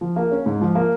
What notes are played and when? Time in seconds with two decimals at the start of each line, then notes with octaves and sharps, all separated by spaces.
0.01 F3
0.16 A#3
0.31 C#4
0.46 G#2
0.61 F3
0.75 A#3